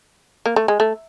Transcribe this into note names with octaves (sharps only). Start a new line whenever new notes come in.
A#3
A3
G#3
A3